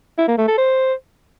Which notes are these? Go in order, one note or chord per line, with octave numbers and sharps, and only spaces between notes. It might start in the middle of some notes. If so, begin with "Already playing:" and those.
E4
A#3
A3
A4
C5